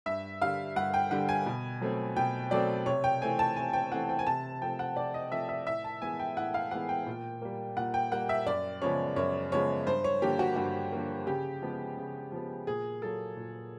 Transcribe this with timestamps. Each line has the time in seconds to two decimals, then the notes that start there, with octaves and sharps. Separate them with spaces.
0.06 G2 E5
0.42 D3 G3 F5
0.76 G2 F#5
0.94 G5
1.11 D3 G3 F#5
1.29 G#5
1.46 B2
1.81 F#3 A3 C4
2.16 B2 G5
2.51 F#3 A3 C4 D5
2.86 C3 C#5
3.04 G5
3.22 E3 A3 C4 G#5
3.39 A5
3.56 C3 G#5
3.73 G5
3.92 E3 A3 C4 F#5
4.09 G5
4.19 G#5
4.27 C3 A5
4.61 F3 A3 C4 G5
4.79 F#5
4.96 C3 D5
5.14 D#5
5.31 F3 A3 C4 E5
5.49 E5
5.67 A2 E5
5.84 A5
6.02 E3 G#3 B3 G#5
6.19 G5
6.36 A2 F#5
6.54 F5
6.71 E3 G#3 B3 F#5
6.89 G5
7.07 A#2
7.42 G3 A#3
7.77 A#2 F#5
7.94 G5
8.12 G3 A#3 F#5
8.29 E5
8.46 F#2 D5
8.82 C#3 F3 G#3 B3 C#5
9.16 F#2 C#5
9.52 C#3 F3 G#3 B3 C#5
9.87 G2 C5
10.04 C#5
10.22 D3 F3 A#3 G4
10.39 F#4
10.56 G2 F#4
10.92 D3 F3 A#3
11.27 C#3 G4
11.62 F3 G#3 B3
11.97 C#3
12.32 F3 G#3 B3
12.67 A#2 G#4
13.02 F#3 A#3 A4
13.37 A#2